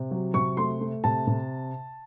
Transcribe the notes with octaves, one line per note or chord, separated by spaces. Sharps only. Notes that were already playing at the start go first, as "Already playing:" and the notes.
Already playing: C3
F#3
C3 C#6
A3 C6
A3
C3 A5
C3